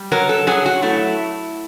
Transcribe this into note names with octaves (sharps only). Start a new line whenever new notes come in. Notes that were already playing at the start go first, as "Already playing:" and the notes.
Already playing: G3
F#3 A#4
A4
F#3 G#4
F#4
A3 E4